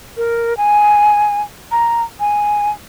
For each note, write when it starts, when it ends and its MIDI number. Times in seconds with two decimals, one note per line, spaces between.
0.17 0.56 70
0.57 1.42 80
1.72 2.02 82
2.20 2.71 80